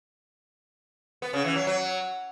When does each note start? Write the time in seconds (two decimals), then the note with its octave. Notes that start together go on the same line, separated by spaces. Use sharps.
1.22 B3
1.33 C#3
1.45 E3
1.56 F#3
1.67 F#3